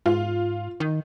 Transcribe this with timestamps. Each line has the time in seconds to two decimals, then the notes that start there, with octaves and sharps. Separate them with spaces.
0.06 G#2 F4
0.80 D#3